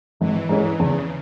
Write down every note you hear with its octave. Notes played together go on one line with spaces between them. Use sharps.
G#1 E3
G#2 E3 G#3 C#4
E2 C#3